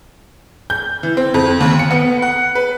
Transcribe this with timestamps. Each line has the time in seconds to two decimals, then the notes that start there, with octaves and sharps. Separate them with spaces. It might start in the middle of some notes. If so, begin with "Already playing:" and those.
0.70 G6
1.03 E3
1.17 C4
1.34 F2
1.61 D#2
1.79 C#7
1.91 B3
2.22 F#5
2.55 B4